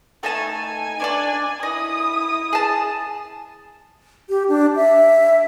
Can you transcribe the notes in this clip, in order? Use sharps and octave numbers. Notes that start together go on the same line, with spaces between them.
A3 D#4 G#5 A5
D4 C#5 D5
E4 D#5 D#6
G#4 A5
G4
D4
E5